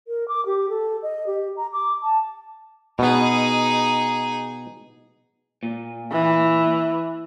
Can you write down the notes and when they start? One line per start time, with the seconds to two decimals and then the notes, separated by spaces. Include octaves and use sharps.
0.08 A#4
0.28 D6
0.46 G4
0.69 A4
1.03 D#5
1.27 G4
1.57 A#5
1.72 D6
2.03 A5
2.99 B2 B3 D#4 G#4
5.63 A#2
6.12 E3